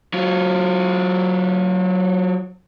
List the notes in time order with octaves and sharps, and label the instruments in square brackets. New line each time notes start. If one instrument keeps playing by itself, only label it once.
[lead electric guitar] F#3 F4